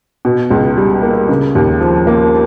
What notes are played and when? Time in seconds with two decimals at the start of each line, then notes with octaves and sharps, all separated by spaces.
0.25 B2
0.51 C#2
0.77 G3
1.02 A#3
1.29 C#3
1.55 D#2
1.81 F3
2.07 A#3